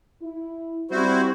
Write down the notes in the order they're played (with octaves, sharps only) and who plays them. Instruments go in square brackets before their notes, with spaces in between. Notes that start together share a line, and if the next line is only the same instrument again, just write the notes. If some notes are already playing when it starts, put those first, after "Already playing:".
[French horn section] E4
[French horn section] G3 C4 [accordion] E4 F#4 C5